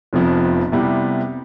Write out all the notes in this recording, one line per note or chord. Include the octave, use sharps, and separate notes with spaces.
F1 F2 C3 F3 B3
C3 G3 B3 E4 G4